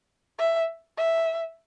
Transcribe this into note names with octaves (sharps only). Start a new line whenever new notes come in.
E5
E5